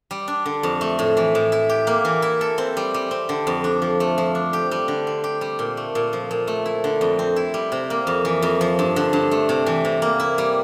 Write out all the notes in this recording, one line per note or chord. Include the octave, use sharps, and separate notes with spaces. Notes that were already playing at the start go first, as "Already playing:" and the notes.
G3
D4
D3
F2
A3
A2
E3
A2
E4
G4
A#3
E3
E4
A4
C4
G3
G3
C4
D3
F2
D4
F3
A3
F3
D4
G4
G3
D3
C4
G4
G3
A#2
A3
A#2
F3
A#2
A3
E4
D3
F2
C4
E4
G3
C3
A#3
F2
E3
F2
F3
G2
D3
G2
A3
C3
E3
C3
A#3
E4
G3